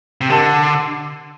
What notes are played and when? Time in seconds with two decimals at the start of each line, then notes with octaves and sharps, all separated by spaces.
0.21 C3
0.29 D3 G4 A#4 D#5 A5 C6